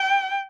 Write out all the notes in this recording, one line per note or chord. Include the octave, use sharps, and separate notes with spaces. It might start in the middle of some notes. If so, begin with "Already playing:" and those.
Already playing: G5